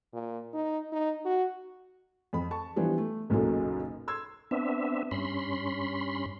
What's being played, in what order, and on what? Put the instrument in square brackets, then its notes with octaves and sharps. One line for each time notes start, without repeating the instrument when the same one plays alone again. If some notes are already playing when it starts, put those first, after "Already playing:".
[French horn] A#2
D#4
D#4
F#4
[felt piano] F2 B5
A5 C#6
E3 F3 G3 B3 D4
A3
F#1 B1 F#2 A#2 F#3 A4
C6 E6 G#6
[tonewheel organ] B3 C4 D4 E5
G2 C#4 B5 C6